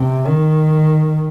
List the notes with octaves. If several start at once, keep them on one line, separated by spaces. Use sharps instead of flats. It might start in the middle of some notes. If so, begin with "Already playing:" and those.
Already playing: C3
D#3